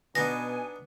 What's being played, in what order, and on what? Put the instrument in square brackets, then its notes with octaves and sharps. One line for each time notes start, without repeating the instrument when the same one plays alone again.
[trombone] B2 [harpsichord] B3 D4 D#4 [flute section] G#5 [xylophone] A#6